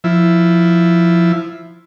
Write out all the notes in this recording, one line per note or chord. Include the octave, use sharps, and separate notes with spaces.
F3 E4